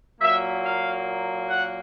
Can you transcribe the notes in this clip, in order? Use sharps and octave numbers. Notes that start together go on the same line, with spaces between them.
A#2 F#3 A#3 E5
F5
F#5